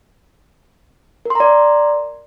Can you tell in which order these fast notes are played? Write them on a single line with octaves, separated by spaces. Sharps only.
A#4 C6 A#5 D5